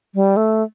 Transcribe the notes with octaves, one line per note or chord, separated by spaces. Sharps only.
G3
A3